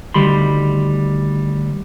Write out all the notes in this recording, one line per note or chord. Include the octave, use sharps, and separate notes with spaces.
D2 D#3 G3 B5 C6